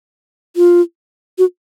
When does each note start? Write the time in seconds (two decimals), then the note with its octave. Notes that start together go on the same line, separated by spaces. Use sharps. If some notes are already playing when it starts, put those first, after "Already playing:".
0.57 F4
1.38 F#4